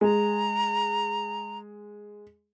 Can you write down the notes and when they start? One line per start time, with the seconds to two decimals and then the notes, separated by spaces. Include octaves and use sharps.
0.01 G#3 A#5